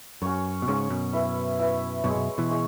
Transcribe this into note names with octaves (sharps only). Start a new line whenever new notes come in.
F#2 C#4 F#4 C#5
B2
G#2 C#3 C#4 F#4 C#5
F#2 B2
E4 B4 E5
E4 B4 E5
F#2 B2 G#3 E4 C#5
F#2 B2
B2 E3
G#3 E4 C#5